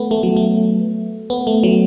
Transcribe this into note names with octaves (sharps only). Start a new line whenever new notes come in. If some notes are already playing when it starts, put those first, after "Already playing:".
Already playing: A3 B3
A3
F#3
A3
B3
A3
F#3